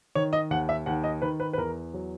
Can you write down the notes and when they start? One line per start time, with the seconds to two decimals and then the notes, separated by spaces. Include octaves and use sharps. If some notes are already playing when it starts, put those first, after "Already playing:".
0.15 D#3 C#5
0.33 D#5
0.51 D#2 F#5
0.69 E5
0.86 D#2 F#5
1.04 D#5
1.22 D#3 B4
1.40 B4
1.53 B4
1.58 E2 A#4
1.94 F#3